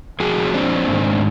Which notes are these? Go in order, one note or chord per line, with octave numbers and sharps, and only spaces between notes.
A#2 F3 F#4 G#4
C#4
C4 D4
G#2 D#3